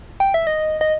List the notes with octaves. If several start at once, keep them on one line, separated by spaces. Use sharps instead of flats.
G5
E5
D#5
D#5